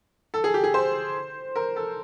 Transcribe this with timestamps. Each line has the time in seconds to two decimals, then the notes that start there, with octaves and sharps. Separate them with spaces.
0.34 A4
0.44 G#4
0.54 G4
0.64 G#4
0.74 C5
1.56 A#4
1.76 A4